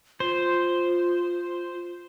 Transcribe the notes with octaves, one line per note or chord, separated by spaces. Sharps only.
F4 C5